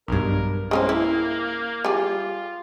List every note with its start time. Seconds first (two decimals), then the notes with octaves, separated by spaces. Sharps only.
0.08 B1 G2 A#4
0.71 G#3 A#3 C#4 C5
0.89 E4
1.85 G3 F4 G#4